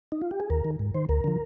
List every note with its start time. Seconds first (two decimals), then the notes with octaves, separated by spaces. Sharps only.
0.12 D#4
0.22 F4
0.31 G4
0.40 G#4
0.50 D#2 A#4
0.65 D#3
0.79 G#2
0.95 D#3 C5
1.09 D2 A#4
1.24 D3 F3